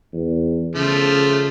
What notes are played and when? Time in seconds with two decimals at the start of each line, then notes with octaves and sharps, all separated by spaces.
0.13 E2
0.75 C#3 F3 A3